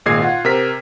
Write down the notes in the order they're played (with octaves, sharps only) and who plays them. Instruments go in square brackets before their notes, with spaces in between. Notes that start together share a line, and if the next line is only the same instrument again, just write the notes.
[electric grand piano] G#1 A#2 G#4 D#5 G#6 C7
F4 F#5
C3 A#4 B6